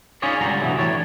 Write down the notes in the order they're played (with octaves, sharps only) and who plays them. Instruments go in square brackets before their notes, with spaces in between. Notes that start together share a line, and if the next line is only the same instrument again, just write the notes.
[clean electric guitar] C#4 D#4 F4 G#4 C#5 D5
C#2 G2 D3 G3 G#4 A#5
C3 E3 F#3 A3
A2 E3 D4 C#5 A5